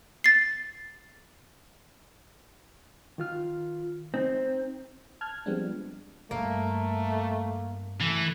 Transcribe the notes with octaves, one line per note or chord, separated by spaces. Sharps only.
A6 C7
D#3 F4 F6
C4 D#4
A5 F6 F#6 G#6
F3 G3 G#3 B3 C4 D4
G2 A3 A#3
E3 A3